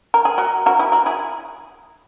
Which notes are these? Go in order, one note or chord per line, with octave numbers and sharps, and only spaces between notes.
A#4
G#4
F#4 A#4
F#4 A#4
E4 G#4
F#4 A#4
E4 G#4